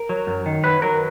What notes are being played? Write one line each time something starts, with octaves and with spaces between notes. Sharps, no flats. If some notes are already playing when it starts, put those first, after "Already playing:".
Already playing: A#4
F#3
F#2
D#3
F#3 B4
F#3 A#4